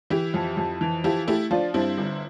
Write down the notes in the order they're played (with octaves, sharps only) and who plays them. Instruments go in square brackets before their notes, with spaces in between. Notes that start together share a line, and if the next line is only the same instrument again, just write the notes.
[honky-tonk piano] E3 E4 G4
F2
F2
E3
F3 E4 G4
A3 E4 G4
F3 D4 F4
G2 C4 E4
G1